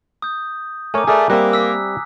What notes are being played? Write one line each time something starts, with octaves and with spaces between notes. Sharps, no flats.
D#6 G6
A3 A#4 C#5 G#5 A#5 D6
A3 G#4 A#4 D5
G3 A#3 C4 E5 F#6
E6 B6